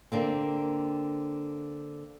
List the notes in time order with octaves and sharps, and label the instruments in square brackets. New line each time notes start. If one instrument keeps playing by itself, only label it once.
[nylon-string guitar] D3 A#3 C4